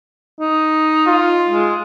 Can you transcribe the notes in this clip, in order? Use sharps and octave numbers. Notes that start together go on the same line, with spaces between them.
D#4
F4
G#3